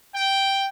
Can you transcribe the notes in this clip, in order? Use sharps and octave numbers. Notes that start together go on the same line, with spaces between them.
G5